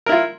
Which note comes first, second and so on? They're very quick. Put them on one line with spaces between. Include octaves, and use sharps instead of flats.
A#4 E4 F4